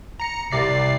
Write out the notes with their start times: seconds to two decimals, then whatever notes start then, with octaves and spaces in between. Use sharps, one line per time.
0.20 A#5 C#7
0.52 C2 C3 D5 C7